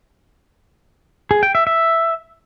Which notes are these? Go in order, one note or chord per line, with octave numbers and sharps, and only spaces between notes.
G#4
G5
E5
E5